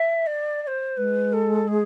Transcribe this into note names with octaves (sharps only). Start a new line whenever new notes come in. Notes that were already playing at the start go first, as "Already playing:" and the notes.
Already playing: E5
D5
D5
C5
G#3 B4
A4
G#4